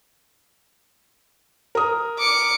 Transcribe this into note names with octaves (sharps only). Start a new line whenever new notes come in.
A#4 D#6
D6 C#7